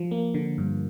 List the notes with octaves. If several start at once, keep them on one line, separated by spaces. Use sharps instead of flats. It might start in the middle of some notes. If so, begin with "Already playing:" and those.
Already playing: F3
A#3
D3
G2